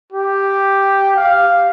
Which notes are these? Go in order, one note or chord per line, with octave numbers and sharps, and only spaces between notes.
G4
F5